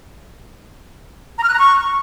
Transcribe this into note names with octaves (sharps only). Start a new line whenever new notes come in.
A#5
F6
F#6
A#5
C#6